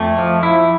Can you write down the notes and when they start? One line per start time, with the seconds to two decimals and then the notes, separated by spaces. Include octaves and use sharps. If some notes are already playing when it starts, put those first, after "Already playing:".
Already playing: F2 A3
0.18 F3
0.43 E4